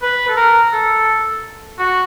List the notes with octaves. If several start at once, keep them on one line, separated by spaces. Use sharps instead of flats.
B4
A4
A#4
A4
F#4